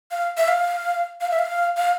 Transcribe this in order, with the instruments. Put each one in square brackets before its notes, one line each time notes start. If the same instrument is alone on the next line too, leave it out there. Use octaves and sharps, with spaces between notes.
[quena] F5
E5
F5
F5
E5
F5
F5